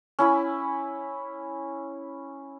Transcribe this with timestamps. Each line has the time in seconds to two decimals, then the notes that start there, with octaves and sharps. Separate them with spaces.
0.19 C#4 E4 G#5 B5